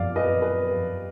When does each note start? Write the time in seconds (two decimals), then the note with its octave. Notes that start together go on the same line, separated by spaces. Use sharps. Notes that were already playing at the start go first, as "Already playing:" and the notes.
Already playing: F#2 F3 B3 D5 F5
0.16 B4 D#5
0.42 B4